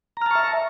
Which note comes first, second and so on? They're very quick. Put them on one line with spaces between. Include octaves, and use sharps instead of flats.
A#5 F6 A5 C#6 E5